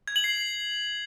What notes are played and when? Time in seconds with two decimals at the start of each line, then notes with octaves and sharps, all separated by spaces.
0.08 G#6
0.16 F#7
0.24 C7